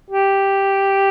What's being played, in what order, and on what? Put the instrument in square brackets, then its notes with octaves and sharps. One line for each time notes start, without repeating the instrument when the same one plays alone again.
[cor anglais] G4